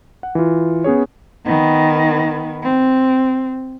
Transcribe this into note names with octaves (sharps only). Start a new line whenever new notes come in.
F#5
E3 F4
B3 C#4 G#4 C#5
D#3 B3
C4